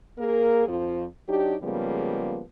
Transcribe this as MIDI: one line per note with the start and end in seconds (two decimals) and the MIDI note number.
0.18 0.64 58
0.18 0.64 68
0.18 0.64 70
0.66 1.04 41
0.66 1.04 53
1.27 1.55 54
1.27 1.55 62
1.27 1.55 63
1.27 1.55 67
1.62 2.40 49
1.62 2.40 53
1.62 2.40 55
1.62 2.40 56
1.62 2.40 58
1.62 2.40 59